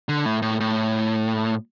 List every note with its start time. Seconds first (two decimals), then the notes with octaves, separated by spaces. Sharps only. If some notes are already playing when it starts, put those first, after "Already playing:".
0.09 D3
0.26 A2
0.42 A2
0.60 A2